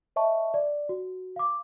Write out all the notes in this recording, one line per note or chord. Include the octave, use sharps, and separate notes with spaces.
C#5 D#5 E5 A5 C#6
D5
F#4
F5 D6